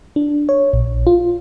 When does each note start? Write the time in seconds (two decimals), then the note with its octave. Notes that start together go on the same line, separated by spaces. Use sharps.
0.16 D4
0.49 C#5
0.73 A#1
1.07 F4